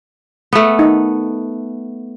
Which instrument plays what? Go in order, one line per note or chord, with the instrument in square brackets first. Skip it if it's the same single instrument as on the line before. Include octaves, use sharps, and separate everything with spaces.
[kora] A3 B3
[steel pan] D#4